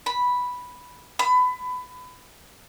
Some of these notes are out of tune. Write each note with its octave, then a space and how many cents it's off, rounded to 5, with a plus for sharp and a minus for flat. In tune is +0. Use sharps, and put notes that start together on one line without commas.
B5 -5
B5 +25